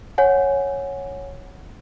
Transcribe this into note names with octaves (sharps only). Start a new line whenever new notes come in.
C#5 F#5 G#5